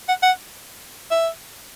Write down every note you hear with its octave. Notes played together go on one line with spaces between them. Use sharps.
F#5
F#5
E5